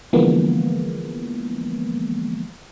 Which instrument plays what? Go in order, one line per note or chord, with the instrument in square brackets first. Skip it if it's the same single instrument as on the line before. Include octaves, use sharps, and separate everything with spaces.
[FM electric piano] D3 E3 F3 G#3 A#3 B3